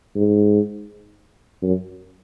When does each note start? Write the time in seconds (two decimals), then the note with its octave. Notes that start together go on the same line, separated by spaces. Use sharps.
0.15 G#2
1.62 F#2